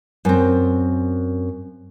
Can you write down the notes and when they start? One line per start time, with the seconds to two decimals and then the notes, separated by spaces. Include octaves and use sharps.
0.25 F#2 C4